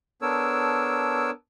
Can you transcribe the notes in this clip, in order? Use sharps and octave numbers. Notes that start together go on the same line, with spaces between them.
B3 D4 A4 A#4 C#5 E6